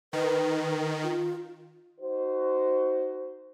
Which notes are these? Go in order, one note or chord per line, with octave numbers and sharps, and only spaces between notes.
D#3 B4
F4
D#4 F#4 C5